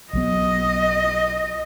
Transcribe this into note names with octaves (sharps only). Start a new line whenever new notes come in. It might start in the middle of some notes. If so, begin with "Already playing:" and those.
B1 F#3 B3 D#5